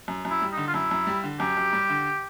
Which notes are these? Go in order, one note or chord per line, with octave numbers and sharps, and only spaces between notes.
F#2
F#2
E4
G3
D3 D#4
F4
F#2 E4
F#2
G3
D3
F#2 G4
F#2
G3
D3